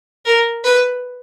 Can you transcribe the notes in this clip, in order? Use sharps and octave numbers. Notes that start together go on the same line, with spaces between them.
A#4
B4